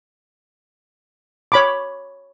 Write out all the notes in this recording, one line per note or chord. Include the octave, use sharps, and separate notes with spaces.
C#5 B5 D6